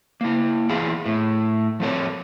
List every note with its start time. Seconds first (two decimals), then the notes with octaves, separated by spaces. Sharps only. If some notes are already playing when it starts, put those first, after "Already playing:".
0.21 A#3 E4
0.69 E3 E4 F4 G#4
1.06 A2
1.80 F3 C4 A4 C#5